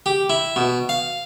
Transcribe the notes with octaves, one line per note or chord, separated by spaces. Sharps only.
G4
E4
B2
F5